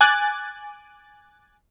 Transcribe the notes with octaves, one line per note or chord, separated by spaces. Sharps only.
G#5 D6 F#6 A6